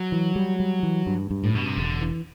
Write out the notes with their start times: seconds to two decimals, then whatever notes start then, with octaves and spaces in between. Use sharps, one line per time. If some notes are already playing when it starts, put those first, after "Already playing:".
Already playing: F#3
0.12 E3
0.36 G3
0.60 G3
0.83 E3
1.07 G2
1.31 G2
1.44 A2
1.54 G2 B2
1.66 C3
1.77 E1 D3
2.01 E3